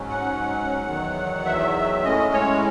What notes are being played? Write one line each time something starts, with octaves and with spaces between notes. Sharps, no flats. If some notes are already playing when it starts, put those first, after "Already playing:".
Already playing: G#2 F#3 C#4
F#5
E2 D#3 F#3
E5
A2 G#3 C#4 D#5
C#5